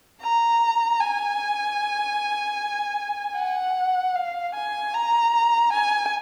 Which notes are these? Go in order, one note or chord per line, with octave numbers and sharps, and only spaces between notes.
A#5
G#5
F#5
F5
G#5
A#5
G#5